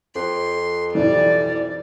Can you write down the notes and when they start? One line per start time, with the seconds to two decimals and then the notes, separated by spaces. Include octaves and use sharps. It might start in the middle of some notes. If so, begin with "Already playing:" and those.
0.15 F2 C6
0.95 B1 E3 G3 D5